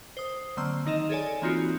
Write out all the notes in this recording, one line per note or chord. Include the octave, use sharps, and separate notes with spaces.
C5 D#6
D3 F#3 A#3 C4 C6 E6
D#3 D#4 D#5 E7
G#4 A4 C#5 D5 G#5
E3 A#3 C4 D#4 F4 F#4